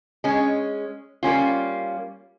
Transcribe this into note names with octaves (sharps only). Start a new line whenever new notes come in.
G#3 C#4
G3 A#3 C#4 F4